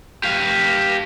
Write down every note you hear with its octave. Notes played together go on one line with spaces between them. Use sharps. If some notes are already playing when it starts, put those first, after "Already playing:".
G4 F5